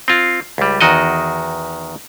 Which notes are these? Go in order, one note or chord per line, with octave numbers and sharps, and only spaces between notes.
C4 F4
C#2 G3
E2 D#3 F#4 D#5